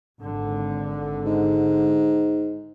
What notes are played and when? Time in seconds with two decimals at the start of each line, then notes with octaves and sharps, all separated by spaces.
0.21 G#1 D3
1.25 G#2